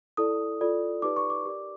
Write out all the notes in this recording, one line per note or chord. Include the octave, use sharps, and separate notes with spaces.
E4 A4 D5 D#6
F4 A4 D5
D#4 G4 B4 D5 D6
C#6
D6
G4 A#4 D5